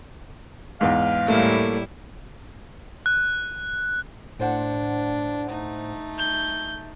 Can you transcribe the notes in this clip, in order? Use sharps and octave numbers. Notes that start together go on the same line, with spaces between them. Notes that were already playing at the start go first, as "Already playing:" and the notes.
E2 G#2 F5
A2 G3 A3 A#3 E4
F#6
A2 D4 C5 F#5
A3 D#4
G6